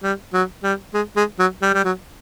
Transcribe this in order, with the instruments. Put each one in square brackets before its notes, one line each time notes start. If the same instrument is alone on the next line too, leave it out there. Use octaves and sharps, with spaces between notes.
[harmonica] G3
F#3
G3
G#3
G#3
F#3
G3
G3
F#3